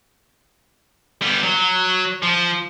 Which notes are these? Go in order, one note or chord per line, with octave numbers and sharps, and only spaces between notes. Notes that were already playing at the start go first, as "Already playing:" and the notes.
G3 B3
F#3
F3